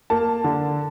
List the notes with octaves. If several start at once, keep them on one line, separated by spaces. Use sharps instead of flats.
A#3 A5
D3